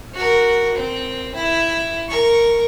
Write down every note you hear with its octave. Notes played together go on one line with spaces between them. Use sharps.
F#4 A#4
C4
E4
A#4 C#6